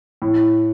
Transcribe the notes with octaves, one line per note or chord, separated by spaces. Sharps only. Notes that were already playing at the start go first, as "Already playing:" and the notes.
A2